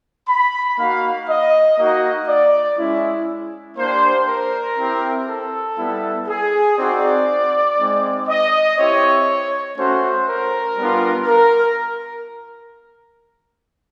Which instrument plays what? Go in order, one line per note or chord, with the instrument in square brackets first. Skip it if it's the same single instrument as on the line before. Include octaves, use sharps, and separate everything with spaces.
[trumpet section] B5
A#3 D#4 F#4 F5
D#5
A#3 D#4 F#4 D#5
D5
G#3 C#4 E4
A#3 D4 G4 C5
A#4
C4 E4 G4
A4
G3 B3 E4
G#4
C4 D#4 F#4 D5
G#3 C4 D#4
D#5
C4 E4 G4 C#5
A3 C#4 F#4 C5
A#4
G3 B3 D4 F4
A#4